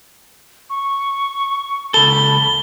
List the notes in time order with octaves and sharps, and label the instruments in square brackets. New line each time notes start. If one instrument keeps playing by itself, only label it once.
[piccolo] C#6
[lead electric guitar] C#2 A4 [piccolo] B5 [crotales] G7